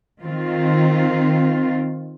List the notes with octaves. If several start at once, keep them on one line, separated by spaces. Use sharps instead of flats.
D#3 C4 F4